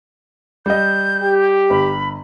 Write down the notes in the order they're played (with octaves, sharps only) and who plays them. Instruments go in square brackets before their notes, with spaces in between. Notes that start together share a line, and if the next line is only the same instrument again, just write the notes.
[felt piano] G3 D#5 [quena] G6
[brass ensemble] G4
[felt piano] G1 [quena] B5